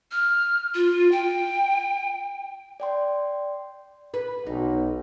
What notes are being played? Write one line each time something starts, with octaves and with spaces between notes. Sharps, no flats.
F6
F4
G5
D5 G5 C6
B4
B1 D#4